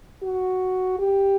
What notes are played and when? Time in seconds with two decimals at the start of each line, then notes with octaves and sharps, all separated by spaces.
0.22 F#4
0.99 G4